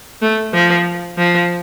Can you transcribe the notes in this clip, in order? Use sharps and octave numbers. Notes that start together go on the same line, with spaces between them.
A3
F3
F3